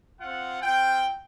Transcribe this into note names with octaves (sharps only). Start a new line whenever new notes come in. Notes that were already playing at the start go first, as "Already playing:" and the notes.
C4 F4 F#5
C4 F4 G5